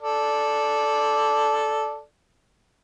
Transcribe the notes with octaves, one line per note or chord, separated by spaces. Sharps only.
A4 D5